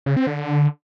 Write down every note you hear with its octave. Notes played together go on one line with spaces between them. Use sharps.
C#3
C4
D3